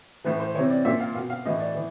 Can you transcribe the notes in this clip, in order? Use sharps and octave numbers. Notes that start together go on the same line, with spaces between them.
A2 E3 B4
C5
C3 E3 C#5
D5
A#2 E5
F5
B2 F5
F5
A2 E3 D#5
D5
E3